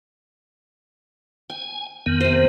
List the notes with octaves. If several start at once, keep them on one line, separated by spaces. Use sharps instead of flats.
G5 G#5
F2 D#3 B3
C3 C5